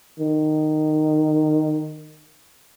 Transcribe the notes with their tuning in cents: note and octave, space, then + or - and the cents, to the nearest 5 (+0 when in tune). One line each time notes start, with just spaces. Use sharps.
D#3 -15